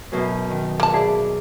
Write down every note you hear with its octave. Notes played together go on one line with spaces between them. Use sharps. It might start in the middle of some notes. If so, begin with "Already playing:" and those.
F#2 B2 E4
D#3
A#3 A5
E4 G#4 D5